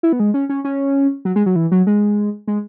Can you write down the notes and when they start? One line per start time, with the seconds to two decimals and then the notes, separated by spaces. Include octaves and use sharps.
0.03 E4
0.12 B3
0.20 G#3
0.34 C#4
0.49 C#4
0.64 C#4
1.25 F#3
1.36 G#3
1.46 F#3
1.56 E3
1.72 F#3
1.87 G#3
2.48 G#3